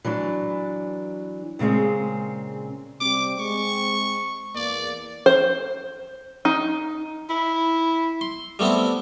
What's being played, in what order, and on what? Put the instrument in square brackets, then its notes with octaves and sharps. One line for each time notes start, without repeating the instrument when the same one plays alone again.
[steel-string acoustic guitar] E3 F#3 D4
A#2 C#3 G#3 C4 G#4
[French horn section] C3 G3 C4 [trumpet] D6
[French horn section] G#3 C4 [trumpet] C#6
[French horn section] E2 A#3 [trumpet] D5
[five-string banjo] C5
D#4
[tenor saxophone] E4
[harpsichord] C6
G3 A3 B3 C4 E4